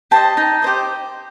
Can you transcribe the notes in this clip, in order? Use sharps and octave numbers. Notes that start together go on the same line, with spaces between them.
G4 C5 D#5 A5
D#4
G4 C5 D#5